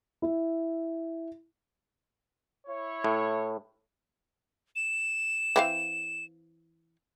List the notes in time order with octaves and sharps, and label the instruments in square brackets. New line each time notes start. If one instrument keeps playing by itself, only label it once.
[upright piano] E4
[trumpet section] E4 C#5
[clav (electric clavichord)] A2
[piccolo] E7
[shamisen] E3 C4 F5